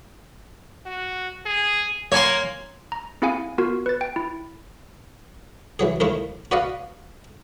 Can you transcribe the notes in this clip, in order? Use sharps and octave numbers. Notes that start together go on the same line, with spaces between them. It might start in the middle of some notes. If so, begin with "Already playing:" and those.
F#4
G#4
A#3 C#5 G#5 C6
A#5
C4 E4 G#4 F5 F#5 G#5
B3 F4 F#4 A#4
B4 A6
G5
E4
E3 F#3 G#4
D#2 F3 A3 D#4 E4 A#4
F#4 B4 D5 D#5 F5 F#5